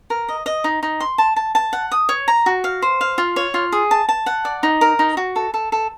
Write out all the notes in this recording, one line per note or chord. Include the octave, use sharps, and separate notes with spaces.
A#4
D#5
D#5
D#4
D#4
C6
A5
A5
A5
F#5
D#6
C#5
A#5
F#4
F5
C5
F5
F4
C#5
F4
G#4
A5
A5
F#5
D5
D#4
A#4
D#4
F#4
A4
A4
A4